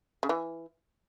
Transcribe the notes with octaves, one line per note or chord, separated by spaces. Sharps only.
C#3
E3